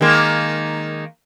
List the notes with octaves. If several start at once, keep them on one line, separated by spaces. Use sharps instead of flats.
D#3 G#3 A#3